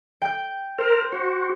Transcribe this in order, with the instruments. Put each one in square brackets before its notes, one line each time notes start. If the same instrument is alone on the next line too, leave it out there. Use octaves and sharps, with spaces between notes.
[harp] G5 G6
[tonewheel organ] A#4 [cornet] C5
[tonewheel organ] F#4 [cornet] C5